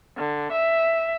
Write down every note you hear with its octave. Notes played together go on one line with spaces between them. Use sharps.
D3
E5